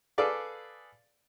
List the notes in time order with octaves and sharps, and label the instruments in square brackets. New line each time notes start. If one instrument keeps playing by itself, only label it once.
[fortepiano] G#4 A4 B4 D5 F5